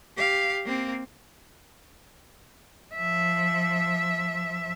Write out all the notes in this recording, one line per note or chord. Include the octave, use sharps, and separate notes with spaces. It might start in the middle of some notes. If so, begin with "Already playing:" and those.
G4 F5
A#3 C4
F3 E5